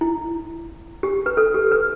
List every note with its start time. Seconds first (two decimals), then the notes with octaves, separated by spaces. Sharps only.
0.01 E4
1.03 G4
1.26 B4
1.37 A4
1.54 G4
1.72 B4